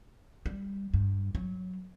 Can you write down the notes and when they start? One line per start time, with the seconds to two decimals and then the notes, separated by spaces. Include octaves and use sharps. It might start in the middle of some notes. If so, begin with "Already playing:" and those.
0.46 G3
0.94 G2
1.35 F#3